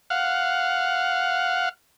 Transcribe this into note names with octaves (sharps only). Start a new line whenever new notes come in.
F5 F#5